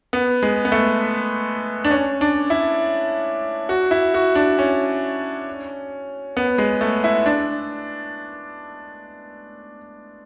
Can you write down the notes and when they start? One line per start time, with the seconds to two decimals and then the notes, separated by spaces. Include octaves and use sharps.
0.13 B3
0.43 G#3
0.65 B3
0.72 A3
1.84 D4
1.91 C#4
2.21 D4
2.50 E4
3.69 F#4
3.91 E4
4.14 F#4
4.35 D4
4.58 C#4
6.37 B3
6.58 G#3
6.81 A3
7.04 E4
7.26 D4